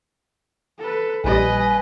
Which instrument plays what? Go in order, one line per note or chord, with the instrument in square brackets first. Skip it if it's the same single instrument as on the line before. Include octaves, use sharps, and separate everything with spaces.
[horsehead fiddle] A4 B4
[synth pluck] A#1 G3 [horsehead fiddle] B4 D#5 [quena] G#5